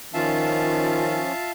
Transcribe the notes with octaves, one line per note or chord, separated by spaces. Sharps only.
D#3 F3 C#4 F4 E5 F5 A5